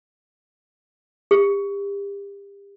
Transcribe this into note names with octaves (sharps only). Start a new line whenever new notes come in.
G4